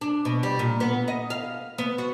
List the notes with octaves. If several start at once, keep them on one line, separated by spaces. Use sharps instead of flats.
D4
B2
G3
A#2
B3
D#5
F5
B3
F#4